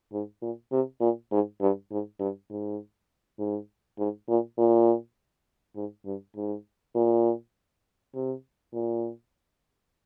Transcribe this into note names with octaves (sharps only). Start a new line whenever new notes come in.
G#2
A#2
C3
A#2
G#2
G2
G#2
G2
G#2
G#2
G#2
A#2
A#2
G#2
G2
G#2
A#2
C3
A#2